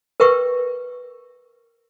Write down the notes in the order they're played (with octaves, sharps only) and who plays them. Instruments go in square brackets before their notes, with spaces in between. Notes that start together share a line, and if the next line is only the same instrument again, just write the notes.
[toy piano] A#4 B4 E5 G5 C#6